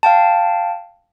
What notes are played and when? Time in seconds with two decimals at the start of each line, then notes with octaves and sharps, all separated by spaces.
0.03 F5 G5 A5